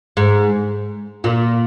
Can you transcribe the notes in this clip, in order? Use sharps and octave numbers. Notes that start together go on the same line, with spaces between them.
G#2
A#2